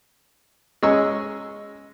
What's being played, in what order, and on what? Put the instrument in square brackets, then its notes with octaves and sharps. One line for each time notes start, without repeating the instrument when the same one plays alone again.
[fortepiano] G#3 C#4 G#4 C#6 E6